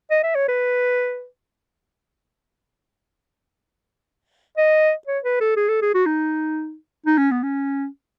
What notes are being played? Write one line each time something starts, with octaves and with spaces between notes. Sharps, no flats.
D#5
E5
C#5
B4
D#5
C#5
B4
A4
G#4
A4
G#4
F#4
D#4
D#4
C#4
B3
C#4